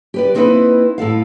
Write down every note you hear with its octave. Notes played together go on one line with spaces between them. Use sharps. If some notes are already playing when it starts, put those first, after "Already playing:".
G4 B4 D5
A#3 C4 D#4 E4 G#4 B4
A2 E4 A4 F5